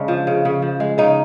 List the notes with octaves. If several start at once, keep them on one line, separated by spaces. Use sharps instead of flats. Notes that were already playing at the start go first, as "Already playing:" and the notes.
Already playing: C#3 G#3 D4
F3
C#3
C#3
F3
G#3
C#3 D#4